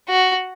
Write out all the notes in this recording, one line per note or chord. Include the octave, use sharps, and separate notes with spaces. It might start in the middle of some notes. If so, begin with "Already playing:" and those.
F#4